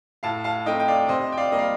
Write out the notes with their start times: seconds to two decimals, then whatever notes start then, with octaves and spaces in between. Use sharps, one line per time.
0.23 A2 F5 A5
0.44 F5 A5
0.66 A3 C4 D#4 D#5 G5
0.80 G5
0.88 D5 F5
1.08 C3 C5 D#5
1.32 G5
1.37 D5 F5
1.52 G3 A#3 D#5
1.59 F5